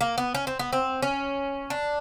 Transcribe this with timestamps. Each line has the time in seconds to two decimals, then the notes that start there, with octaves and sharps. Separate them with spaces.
0.01 A#3
0.18 B3
0.35 C#4
0.47 C4
0.59 B3
0.73 C4
1.02 C#4
1.70 D4